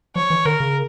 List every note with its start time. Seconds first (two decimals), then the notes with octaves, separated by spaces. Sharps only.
0.15 F3 C#5
0.30 E3
0.45 D3 A#4
0.60 C#3